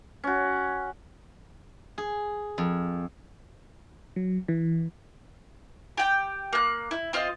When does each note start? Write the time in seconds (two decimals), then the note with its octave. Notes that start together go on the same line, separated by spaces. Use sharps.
0.24 C#4 F#4
1.98 G#4
2.58 F2
4.16 F#3
4.48 E3
5.97 G4 G5
6.53 A#3 F#6
6.91 E4
7.13 C4 F4 D#5